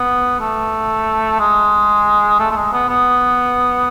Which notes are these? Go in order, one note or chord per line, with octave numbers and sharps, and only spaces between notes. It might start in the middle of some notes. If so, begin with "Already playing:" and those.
Already playing: B3
A3
G#3
A3
A3
G#3
B3
B3